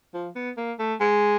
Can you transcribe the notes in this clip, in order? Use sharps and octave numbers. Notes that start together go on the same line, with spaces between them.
F3
B3
A#3
A3
G#3